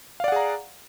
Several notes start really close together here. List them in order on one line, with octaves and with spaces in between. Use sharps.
F5 D5 F#5 G#4 A#5